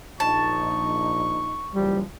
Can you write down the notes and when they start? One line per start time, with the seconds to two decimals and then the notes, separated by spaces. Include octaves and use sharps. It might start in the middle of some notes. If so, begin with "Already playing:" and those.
0.20 A#1 D#4 A5 C#6
1.75 F#1 E3 F3 G3